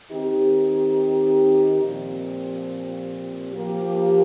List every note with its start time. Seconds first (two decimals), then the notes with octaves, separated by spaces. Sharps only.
0.10 D#3 C4 D#4 G4
1.82 A#2 F3 C4 G4
3.53 F3 A#3 G4